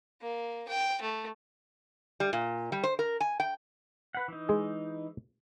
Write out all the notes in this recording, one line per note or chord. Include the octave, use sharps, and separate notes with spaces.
A#3
G5
A3
G3
A#2
G3
C5
A#4
G#5
G5
B4 F#5
E3 D#4
G#3 G#4